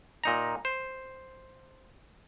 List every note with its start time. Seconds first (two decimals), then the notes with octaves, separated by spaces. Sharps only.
0.24 A#2 D#4 A#5
0.65 C5